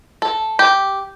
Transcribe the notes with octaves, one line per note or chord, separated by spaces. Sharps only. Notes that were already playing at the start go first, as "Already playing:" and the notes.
A4
G4